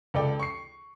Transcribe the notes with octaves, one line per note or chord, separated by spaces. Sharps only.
C#2 A4 D5 G5
C#6 C7